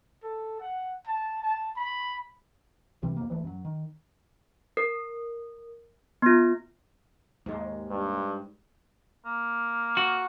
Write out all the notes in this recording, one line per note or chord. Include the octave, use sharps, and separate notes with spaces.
A4
F#5
A5
A5
B5
C#2 C3 E3 G3
F2 A#3
D#1 E3 G#3 A3
F#2 F#3
D#3
A#4
B3 F4
D#2 G#2 G#3
G2
A#3
F#4